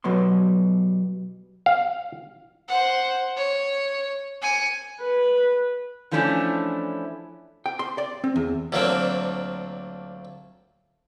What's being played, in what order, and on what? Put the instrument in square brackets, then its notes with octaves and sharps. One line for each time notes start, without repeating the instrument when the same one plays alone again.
[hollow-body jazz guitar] B2 F#3 G3 B3 C6
[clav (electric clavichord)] F5
[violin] C5 F#5
C#5
G#5 C#7
[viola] B4
[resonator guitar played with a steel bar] E3 F3 A3 C#4 D4 E4
[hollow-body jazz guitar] G5
C6
D5
C4
E2
[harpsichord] D2 A#2 F#3 A#3 C4 D4